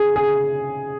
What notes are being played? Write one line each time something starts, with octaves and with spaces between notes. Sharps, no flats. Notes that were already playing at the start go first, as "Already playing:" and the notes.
Already playing: G#4
G#4